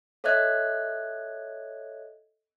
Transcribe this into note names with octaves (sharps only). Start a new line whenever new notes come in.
A4 C#5 D#5 E5 F#6 G#6